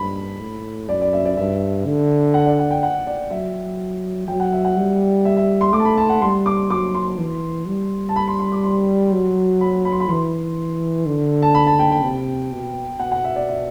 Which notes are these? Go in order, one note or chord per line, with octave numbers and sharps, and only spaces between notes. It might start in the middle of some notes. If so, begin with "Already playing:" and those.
Already playing: G2 B5
A2
F#2 D5
D5
E5
D5
G2 E5
D3
F#5
D5
F#5
G5
F#5
D5
F#3 E5
F#3 G5
F#5
E5
F#5
G3
E5
E5
C6
A3 D6
A5
B5
A5
F#5
G3 C6
D6
F#3 D6
C6
E3
G3
A5
B5
C6
C6
D6
C6
F#3
B5
B5
C6
B5
E3 C6
D3
A5
B5
A5
G5
G5
C3
B2
B2 F#5
F#5
E5
D5
E5